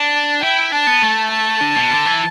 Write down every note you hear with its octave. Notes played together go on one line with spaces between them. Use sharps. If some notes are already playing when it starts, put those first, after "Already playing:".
Already playing: D4 A5
E4 G5
D4 A5
B3
A3
A5
D3
B2
D3
E3